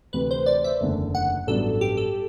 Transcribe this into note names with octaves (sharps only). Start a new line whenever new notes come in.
D2 C3 E3 B4
C5
D5
E5
F#1 E2 D3 A3
F#5
A1 G2 F#3 B3 D4 A4
G4
A4